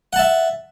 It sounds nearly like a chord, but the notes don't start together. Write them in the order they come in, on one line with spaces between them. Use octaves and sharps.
F#5 A5 E5